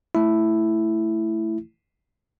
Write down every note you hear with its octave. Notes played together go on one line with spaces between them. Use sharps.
A3 E4